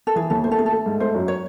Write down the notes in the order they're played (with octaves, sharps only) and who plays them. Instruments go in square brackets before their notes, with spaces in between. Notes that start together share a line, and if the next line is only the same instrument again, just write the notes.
[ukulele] A4
[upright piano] E3 [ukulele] G#4
[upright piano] D#2 [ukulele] A4
[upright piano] A3 [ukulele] C5
[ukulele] A4
[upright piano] A3 [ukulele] G#4
[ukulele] A4
[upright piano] A3
G#2
[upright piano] A3 [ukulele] C5
[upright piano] F#2
[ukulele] C#5